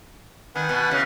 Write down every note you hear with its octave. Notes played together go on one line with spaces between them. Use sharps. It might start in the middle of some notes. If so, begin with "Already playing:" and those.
D#3 B4 F#5 G#5
B2
C#3 E3